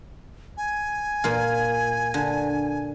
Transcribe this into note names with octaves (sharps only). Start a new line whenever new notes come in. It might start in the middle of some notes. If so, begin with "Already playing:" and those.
G#5
A#2 A#3 F4
D3